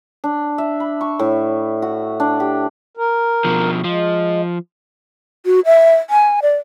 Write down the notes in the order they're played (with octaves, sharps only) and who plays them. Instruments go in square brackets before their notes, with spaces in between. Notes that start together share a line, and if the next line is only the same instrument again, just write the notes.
[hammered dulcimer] D4
E5
B5
C#6
A2
F#4
D4
G4
[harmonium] A#4
[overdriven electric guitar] B2 F3
[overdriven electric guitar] F3 [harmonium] G#3
[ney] F#4
E5
G#5
D5